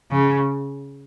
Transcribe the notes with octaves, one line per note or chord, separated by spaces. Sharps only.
C#3